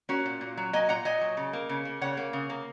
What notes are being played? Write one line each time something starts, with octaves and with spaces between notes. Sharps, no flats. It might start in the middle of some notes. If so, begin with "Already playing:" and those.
A#3 C#4 F#4
A#2
A#2
F#3
A#3 D#5 G#5
A#2 F#5 A#5
A#2 D#5 G#5
F#3
C#3
A#3
C#3
A#3
C#3 C#5 F#5
A#3
C#3
A#3